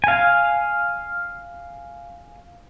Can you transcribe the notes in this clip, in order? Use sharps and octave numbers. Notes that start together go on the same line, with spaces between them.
F5 G#5